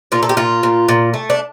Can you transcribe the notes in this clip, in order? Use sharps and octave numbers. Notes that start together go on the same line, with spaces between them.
A#2 F4
A4
G4
A#2 F4
A#2
A#2
A3
D4